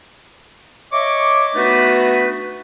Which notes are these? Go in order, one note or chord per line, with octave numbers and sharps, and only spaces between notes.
C#5 D#5 E5 C#6 D6
A3 B3 D4 D#4 F#4 B4